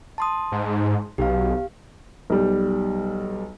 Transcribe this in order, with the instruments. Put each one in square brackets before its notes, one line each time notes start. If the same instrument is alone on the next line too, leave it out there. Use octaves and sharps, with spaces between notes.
[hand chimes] A5 C6 D#6
[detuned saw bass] G#2
[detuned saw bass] B1 [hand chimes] G4 F5
[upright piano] B1 G3